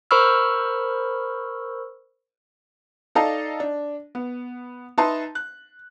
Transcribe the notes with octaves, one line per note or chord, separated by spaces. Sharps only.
A#4 C5 B5 C#6 E6 F6
D#4 A4 D5 D#5 F5 A5
D4
B3
D#4 B4 E5 A5 C6
F#6